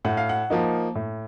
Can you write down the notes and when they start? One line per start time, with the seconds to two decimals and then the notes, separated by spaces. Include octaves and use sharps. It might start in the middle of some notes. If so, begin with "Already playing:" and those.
0.05 A2 F#5
0.17 F5
0.29 F#5
0.50 F3 A#3 D#4
0.95 A2